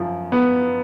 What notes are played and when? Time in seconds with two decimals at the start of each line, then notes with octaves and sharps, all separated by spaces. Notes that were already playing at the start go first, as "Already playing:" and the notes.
Already playing: F#2 F3
0.32 B3